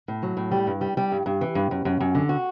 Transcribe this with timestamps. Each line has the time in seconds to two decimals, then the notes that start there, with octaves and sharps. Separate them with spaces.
0.08 A2
0.23 F#3
0.37 A2
0.52 G3
0.67 G2
0.81 G3
0.97 G3
1.12 G2
1.26 G2
1.41 E3
1.55 G2
1.71 F#2
1.85 F#2
2.00 F#2
2.15 D3
2.29 F#4